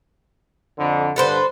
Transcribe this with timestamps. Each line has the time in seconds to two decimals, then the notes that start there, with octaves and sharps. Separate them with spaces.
0.77 F2 D3
1.16 G2 D3 A4 B4 C5